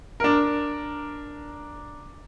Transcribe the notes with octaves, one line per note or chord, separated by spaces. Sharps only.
D4 A#4